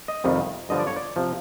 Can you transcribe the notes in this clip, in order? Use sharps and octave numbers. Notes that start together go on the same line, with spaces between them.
D#5
F2 C3 D#3 G3
G2 D3 F3 D#5
D5
C#5
D5
C3 F3